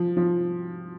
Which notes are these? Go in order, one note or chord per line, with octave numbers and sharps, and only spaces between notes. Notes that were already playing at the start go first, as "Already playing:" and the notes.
Already playing: F3
F3